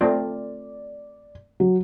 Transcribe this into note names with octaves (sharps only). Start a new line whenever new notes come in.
A3 C4 F4 D5
F#3